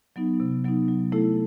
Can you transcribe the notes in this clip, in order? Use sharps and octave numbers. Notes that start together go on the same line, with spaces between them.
F#3 B3 D#4
C3
F#3 B3 D#4
F#3
A3 E4 A4